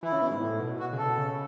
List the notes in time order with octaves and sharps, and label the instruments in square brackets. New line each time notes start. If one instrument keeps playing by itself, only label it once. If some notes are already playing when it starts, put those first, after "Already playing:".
[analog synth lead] E3 [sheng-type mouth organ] E4
[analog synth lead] C#3
B2
G#2
A2
B2
[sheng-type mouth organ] F#4
[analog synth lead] C#3
[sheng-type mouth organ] A4
[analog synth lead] B2
C#3